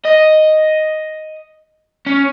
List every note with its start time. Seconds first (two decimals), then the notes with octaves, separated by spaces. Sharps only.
0.05 D#5
2.07 C#4